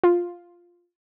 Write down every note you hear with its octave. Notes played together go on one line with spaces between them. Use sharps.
F4